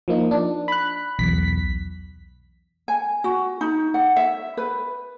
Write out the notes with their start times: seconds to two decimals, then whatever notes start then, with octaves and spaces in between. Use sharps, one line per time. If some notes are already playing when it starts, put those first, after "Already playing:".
0.08 F3 A#3 D#4
0.31 D4
0.68 B5 F#6
1.19 B1 E2 B6
2.88 G#5
3.24 F#4
3.61 D#4
3.94 F#5
4.16 E5
4.57 B4